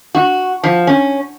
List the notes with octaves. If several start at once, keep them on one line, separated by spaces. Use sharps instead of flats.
F#4
F3
C#4